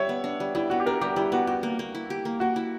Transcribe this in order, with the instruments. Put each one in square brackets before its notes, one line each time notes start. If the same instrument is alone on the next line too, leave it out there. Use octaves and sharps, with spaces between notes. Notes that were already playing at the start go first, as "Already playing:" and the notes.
Already playing: [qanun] G3 [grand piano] C#5 E5
[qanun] B3
D4
G3
[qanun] G3 [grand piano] E4
[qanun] B3 [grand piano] F#4
[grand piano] G4
[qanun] D4 [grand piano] A#4
[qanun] G3 [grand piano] G4
[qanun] G3 [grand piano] E4
[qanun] B3 [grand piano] F#4
[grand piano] F#4 [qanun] G4
[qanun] A#3
A#3
E4
G4
A#3
[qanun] A#3 [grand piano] F#4
[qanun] E4